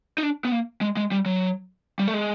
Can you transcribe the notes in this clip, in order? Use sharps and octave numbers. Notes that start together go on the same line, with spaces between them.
D#4
D4
B3
A#3
G#3
G#3
G3
F#3
G3
A3
G#3